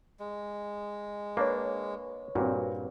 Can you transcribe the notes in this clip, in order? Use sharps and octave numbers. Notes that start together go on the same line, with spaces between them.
G#3
A#3 D4 B4 C#5
G2 A#2 C4 F#4